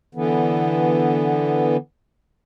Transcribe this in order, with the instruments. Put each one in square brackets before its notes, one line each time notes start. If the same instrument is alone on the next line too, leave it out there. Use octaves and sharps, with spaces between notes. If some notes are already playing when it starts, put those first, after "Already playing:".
[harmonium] D3 E3 B3